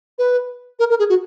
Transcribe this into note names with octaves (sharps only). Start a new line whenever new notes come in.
B4
A#4
A#4
G#4
F#4